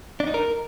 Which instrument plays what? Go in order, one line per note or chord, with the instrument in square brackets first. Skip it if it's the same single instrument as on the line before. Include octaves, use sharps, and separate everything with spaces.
[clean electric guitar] D4
D#4
A#4